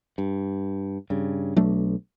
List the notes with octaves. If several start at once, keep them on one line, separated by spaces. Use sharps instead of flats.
G2
G2 C#3
B1 F#3 A3 D4